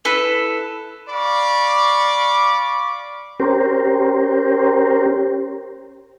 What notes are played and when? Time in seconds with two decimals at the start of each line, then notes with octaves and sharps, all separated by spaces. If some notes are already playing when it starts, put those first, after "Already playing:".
0.05 E4 A4 B4
1.09 D5 F5 B5 C#6 D6
3.40 C#4 G4 A#4 C5